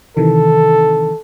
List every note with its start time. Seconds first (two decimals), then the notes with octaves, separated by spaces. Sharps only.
0.17 C3 D#3 E3 A4